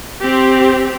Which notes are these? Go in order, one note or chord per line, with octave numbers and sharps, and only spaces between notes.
C4 G4